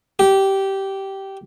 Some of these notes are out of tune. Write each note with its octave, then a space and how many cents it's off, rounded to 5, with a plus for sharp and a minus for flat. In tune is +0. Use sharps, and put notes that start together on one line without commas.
G4 -15